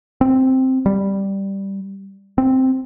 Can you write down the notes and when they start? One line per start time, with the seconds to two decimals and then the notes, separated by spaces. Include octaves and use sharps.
0.21 C4
0.86 G3
2.38 C4